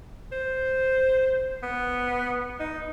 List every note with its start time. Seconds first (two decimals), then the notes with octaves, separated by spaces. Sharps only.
0.32 C5
1.63 B3
2.60 D#4